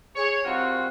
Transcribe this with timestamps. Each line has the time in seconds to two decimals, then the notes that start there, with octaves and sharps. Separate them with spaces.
0.15 G#4 C#5
0.45 D#3 G3 C4 F4 F#4